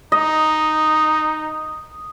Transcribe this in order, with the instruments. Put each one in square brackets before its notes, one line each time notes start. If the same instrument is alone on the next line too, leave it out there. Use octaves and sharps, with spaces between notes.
[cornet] D#4 [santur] D#5